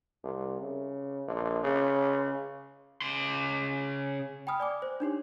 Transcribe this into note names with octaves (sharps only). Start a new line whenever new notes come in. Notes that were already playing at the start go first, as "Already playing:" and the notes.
C2
C#3
A#1
C#3
C#3 C6
G5 G#5 B5 D#6 F6
D5 G#5 D6
C5
D4 D#4 G4 C#5